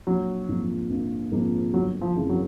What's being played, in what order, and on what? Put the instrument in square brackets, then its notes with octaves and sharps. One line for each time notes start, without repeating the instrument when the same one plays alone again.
[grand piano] A#1 [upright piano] F#3
[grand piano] G#2 F3 A#3 D#4
A#1
G#2 F3 A#3 D#4
[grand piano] G1 [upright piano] F#3
[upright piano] F3
[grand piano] F#2 C#3 E3
[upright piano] F#3